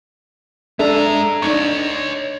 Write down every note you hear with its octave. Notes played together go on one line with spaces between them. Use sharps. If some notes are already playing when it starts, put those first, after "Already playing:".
G#3 D4 A4 E5 A#5
D4 D#4 C#5 D#5 C#6